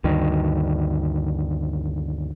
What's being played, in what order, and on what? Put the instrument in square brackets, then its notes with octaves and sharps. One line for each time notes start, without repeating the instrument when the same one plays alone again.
[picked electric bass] D2 G2 D#3